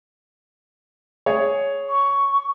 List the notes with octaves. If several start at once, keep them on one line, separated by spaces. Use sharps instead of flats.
G#4 C#5
C#6